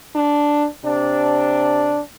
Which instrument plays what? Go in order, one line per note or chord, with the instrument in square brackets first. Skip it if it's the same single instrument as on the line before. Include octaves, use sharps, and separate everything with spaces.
[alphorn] D4
[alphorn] C3 [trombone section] D4